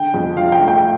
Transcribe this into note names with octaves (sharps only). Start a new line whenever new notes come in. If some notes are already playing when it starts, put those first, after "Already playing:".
Already playing: D3 G5
F2
F3 F5
G5
A3
G5